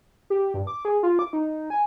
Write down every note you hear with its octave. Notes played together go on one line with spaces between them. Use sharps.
G4
G2
D6
G#4
F4
D6
D#4
G#5